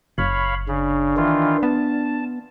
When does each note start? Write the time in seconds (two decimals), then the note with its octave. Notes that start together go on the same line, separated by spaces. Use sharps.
0.18 F#1 C#5 F5 B5
0.68 C#3 D4
1.17 D#3 E3 F4
1.63 B3 A5